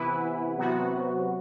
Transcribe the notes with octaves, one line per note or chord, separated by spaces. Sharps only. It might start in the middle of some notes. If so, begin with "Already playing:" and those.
Already playing: C3 E3 B3 E4 B4
C3 F#3 B3 F#4